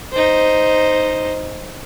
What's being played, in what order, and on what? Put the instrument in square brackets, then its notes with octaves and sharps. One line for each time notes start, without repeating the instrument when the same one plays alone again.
[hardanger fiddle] D#4 C5